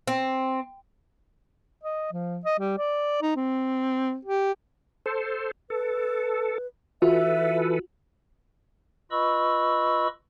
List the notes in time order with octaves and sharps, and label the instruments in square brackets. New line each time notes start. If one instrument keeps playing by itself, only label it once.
[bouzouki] C4
[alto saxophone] D#5
F3
D#5
G3
D5
D#4
C4
G4
[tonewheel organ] A4 C5
[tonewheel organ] A4 [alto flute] B4
[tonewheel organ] E3 A4 B4 [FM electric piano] F4 F#4 [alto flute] E5
[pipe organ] F4 B4 D#5 B5 C#6 E6